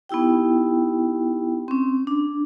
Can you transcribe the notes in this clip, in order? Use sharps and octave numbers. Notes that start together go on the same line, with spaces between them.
B3 D#4 E4 G4 G5
C4 C#4
D4